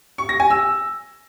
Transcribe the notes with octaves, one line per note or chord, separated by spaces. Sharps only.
C#6
A#6
G#5
E6